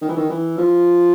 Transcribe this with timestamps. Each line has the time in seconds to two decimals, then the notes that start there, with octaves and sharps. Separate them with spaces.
0.01 D#3
0.09 E3
0.17 D#3
0.29 E3
0.58 F3